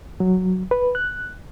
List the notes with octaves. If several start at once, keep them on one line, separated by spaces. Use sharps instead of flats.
F#3
B4
F#6